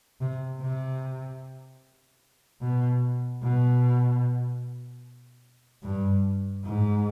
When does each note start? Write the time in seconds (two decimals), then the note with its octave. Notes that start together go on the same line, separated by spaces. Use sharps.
0.21 C3
0.61 C3
2.61 B2
3.42 B2
5.83 G2
6.64 G#2